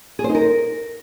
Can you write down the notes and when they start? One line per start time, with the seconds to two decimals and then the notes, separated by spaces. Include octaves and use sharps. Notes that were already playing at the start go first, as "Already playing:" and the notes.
0.19 G#4
0.24 C5
0.29 D#4
0.35 A#4